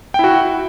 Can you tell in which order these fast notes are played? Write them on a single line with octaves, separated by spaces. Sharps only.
G5 E4 F#4